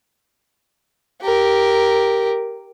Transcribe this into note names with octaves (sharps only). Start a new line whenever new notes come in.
G4 A#4